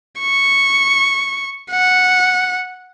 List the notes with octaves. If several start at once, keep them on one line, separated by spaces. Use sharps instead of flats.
C#6
F#5